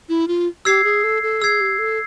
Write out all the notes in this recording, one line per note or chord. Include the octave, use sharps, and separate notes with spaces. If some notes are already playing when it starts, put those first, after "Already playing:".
E4
F4
G4 E6 G#6 C7
G#4
A4
A4
G#4 E6 G#6 C7
G4
A4